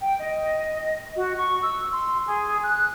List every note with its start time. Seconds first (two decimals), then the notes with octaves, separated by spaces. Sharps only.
0.01 G5
0.19 D#5
1.16 F#4
1.37 C#6
1.60 E6
1.91 C6
2.27 G#4
2.63 F#6